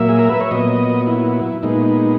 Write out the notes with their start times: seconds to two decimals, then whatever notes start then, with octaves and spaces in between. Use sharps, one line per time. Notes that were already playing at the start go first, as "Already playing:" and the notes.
Already playing: A#2 F#3 A#3 E5
0.09 G#4
0.19 A#4
0.29 B4
0.41 C#5
0.51 A#2 F#3 B3 D#5
1.07 E4
1.63 A#2 G#3 B3 D#4